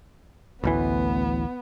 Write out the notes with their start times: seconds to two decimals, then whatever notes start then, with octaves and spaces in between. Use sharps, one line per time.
0.64 A1 D2 E3 B3